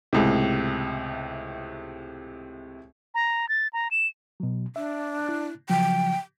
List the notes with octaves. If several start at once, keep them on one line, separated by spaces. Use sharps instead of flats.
C#2 A2 C3
A#5
A6
A#5
E7
B2 F#3
D4 E5
E4 F#6
C#3 F3 F#3 G5